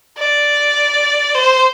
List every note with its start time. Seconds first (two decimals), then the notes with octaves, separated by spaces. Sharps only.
0.19 D5
1.35 C5